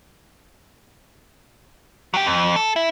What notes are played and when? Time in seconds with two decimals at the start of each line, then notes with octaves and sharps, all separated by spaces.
2.14 F#3 G4
2.26 F2
2.56 A4
2.76 E4